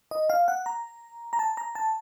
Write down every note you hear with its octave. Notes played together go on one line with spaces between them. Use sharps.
D#5
F5
F#5
A#5
A#5
A5
A#5
A5